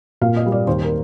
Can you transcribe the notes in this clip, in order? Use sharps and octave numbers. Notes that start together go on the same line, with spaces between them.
A#2 F5
D#5
G3 A#3
D5
D#2 C5
A#4